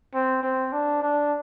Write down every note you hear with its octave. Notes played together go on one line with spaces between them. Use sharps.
C4
C4
D4
D4